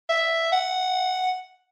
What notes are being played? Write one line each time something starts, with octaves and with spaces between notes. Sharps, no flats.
E5
F#5